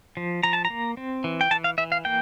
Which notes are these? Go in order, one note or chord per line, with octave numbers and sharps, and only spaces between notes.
F3
F3 A#5
A5
A#5
A#3
C4
E3
G5
E3 A5
F5
E3 E5
F5
A#3 G5